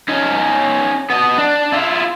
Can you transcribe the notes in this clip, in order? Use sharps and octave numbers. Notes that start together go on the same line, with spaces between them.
C#4 D#4
B3 D#5
D4
E4 F4